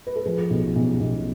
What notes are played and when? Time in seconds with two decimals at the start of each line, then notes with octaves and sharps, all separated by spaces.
0.07 B4
0.16 A4
0.26 F3 G#4
0.50 B1
0.75 B1
1.00 B1